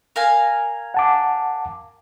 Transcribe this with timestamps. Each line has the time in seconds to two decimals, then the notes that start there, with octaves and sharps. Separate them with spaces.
0.16 A#4 F5 G#5
0.94 F#5 A5 D6